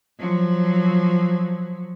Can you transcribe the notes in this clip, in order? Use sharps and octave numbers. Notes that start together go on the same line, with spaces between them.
F3 F#3